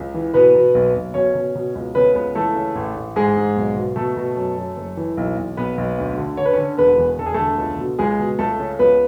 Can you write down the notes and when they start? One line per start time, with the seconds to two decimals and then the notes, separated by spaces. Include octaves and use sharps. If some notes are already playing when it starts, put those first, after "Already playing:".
Already playing: C#2
0.14 E3
0.34 B2 B3 B4
0.55 B2
0.75 B1
0.95 B1
1.14 B2 C#4 C#5
1.35 B2
1.55 B2
1.75 C#2
1.95 C#3 B3 B4
2.15 C#2 B3 B4
2.35 E3 A3 A4
2.55 C#3
2.75 A1
2.96 A1
3.16 G#2 G#3 G#4
3.37 G#2
3.56 B1
3.76 B2
3.96 B2 A3 A4
4.17 B2
4.36 F#2
4.57 F#2
4.77 F#1
4.97 E3
5.17 B1
5.37 B1
5.57 B1 B3 B4
5.78 B1
5.98 D2
6.18 D3
6.37 D3 C#5
6.45 B4
6.53 D3 C#4 C#5
6.78 E1 B3 B4
6.98 E2
7.19 E1 A4
7.26 G#4
7.34 D3 A3 A4
7.58 C#2
7.78 B2
7.99 C#2 G#3 G#4
8.20 B2
8.39 C#2 A3 A4
8.59 C#3
8.79 C#2 B3 B4